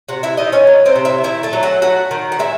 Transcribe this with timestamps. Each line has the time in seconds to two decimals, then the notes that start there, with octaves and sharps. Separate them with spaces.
0.09 C3 F#4 F#5
0.23 E4 E5
0.37 D#3 D#4 D#5
0.52 C#4 C#5
0.67 F#3
0.85 C4 C5
0.96 C3
1.05 E4 E5
1.24 D#3 E4 E5
1.43 A3 A4
1.53 F#3
1.63 F#4 F#5
1.82 A3 F#4 F#5
2.11 D#3
2.32 F#5
2.39 G#3 E4 E5